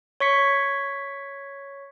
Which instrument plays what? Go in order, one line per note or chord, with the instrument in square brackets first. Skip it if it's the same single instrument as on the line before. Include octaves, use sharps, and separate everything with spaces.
[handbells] C#5 C#6 B6 C#7